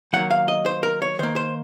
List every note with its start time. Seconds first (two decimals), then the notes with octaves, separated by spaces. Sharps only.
0.13 D#3 F#3 A#3 F#5
0.31 F5
0.48 D#5
0.66 C5
0.83 A#4
1.02 C#5
1.19 D#3 A#3 C5
1.36 C5